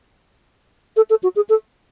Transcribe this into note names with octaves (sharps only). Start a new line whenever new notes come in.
A4
A4
F#4
G#4
A4